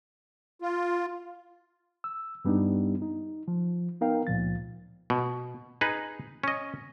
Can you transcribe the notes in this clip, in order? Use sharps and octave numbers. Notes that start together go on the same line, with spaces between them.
F4
E6
G2 G3 B3 D4 D#4 G4
D#4
F3
B3 D#4 A#4 F5 G5
C#2 A#2 F3 A6
B2
D#4 G#4 B4
C#4 D#5